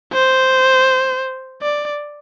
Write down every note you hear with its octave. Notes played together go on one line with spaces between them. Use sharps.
C5
D5